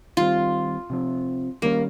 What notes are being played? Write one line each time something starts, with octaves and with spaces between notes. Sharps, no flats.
D#3 G3 C4 F4
C3 F3 C4
D#3 G3 A#3 C#4